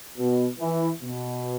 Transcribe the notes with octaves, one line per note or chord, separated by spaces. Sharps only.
B2
E3
B2